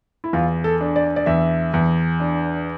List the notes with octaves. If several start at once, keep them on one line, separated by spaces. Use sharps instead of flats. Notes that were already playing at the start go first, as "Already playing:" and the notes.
E4
E2 F4
A4
D4
D5
D5
E2 E5
E2
D4